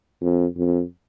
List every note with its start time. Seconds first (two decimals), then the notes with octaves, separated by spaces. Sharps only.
0.21 F2
0.57 F2